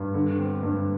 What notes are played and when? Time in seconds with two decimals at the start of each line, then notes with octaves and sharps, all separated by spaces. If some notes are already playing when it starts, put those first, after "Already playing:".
Already playing: G2
0.14 D3
0.39 C4
0.63 G2